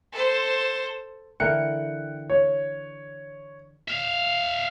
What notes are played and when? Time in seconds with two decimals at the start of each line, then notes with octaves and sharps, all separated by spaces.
0.13 A4 C5
1.40 D3 E3 A#4 G5 F#6 C#7
2.30 C#5
3.88 E5 F5